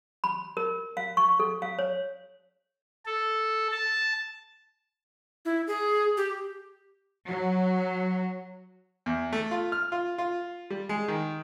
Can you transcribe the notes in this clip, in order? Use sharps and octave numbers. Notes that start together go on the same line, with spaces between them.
B5
A#4
F5
C#6
A4
F5
C#5
A4
A5
E4
G#4
G4
F#3
E2
A3
F4
F6
F4
F4
G3
G#3
D#3